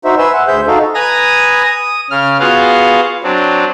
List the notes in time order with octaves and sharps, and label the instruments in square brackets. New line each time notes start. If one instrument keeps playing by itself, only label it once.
[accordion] D#4 F#4 C5 E5
B4 E5 G#5 C6 E6
F#5
D2 G#4 C5 E5 G6
D#4 F#4 A4 D#5 F5
[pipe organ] B4 G#5 A#5 D#6 A#6
D#6
C#3 F6
B3 F4 F#4 G#4 F5 F#5
F#3 C4 D4